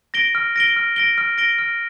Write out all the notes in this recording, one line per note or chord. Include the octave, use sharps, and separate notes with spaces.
A#6 D7 G7
F6
A#6 D7 G7
F6
A#6 D7 G7
F6
A#6 D7 G7
F6